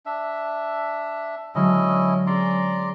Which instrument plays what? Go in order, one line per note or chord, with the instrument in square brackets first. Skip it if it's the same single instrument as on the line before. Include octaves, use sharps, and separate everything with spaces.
[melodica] D4 E5
[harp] D3 F#3 G#3 [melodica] C#4 E4 D#5
[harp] C#4 G#4 [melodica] D5 A#5 C6